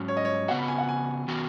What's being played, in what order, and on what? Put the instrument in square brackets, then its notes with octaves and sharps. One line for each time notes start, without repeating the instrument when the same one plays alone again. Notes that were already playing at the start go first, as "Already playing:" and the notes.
Already playing: [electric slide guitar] G#2 F#3 C#4
[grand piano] C#5
D#5
C#5
[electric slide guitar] C#3 B3 F#4 [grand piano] F#5
[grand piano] B5
G#5
F#5
G#5
[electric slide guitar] D#3 B3 F#4